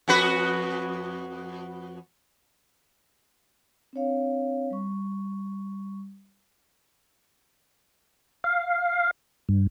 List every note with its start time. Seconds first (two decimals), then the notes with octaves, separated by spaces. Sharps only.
0.08 F2 F#4 B4
3.93 C4 D4 C#5 F5
4.71 G3 C#6
8.44 F5
9.49 G2